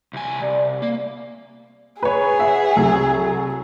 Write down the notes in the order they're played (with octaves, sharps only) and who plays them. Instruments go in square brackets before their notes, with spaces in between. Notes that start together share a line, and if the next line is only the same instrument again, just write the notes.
[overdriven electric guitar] C2 G#5
[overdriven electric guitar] C2 [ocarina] D5
[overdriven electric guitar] A#3
[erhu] G#4 [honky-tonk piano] B4 C#5
[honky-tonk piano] E5 F#5
C2 F#3 A4